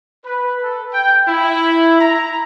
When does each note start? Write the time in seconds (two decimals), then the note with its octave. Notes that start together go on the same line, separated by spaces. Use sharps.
0.24 B4
0.62 A4
0.92 G5
1.27 E4
2.00 A#5